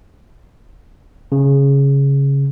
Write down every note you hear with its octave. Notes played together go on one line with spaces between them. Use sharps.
C#3